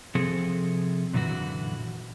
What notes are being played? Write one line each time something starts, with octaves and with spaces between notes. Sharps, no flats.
C3 F3 C4 G#4 A4
F#2 A#2 D3 E3 F#4